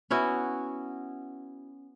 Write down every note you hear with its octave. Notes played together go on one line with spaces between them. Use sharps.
B3 C#4 E4 F#4